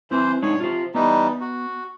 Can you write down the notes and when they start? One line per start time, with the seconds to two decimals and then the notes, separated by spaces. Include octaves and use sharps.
0.11 E3 C4 E4 C5
0.42 G#3 D4 D#4 C#5
0.60 C3 F4 C5
0.95 E3 G3 B3 D#4
1.41 F#4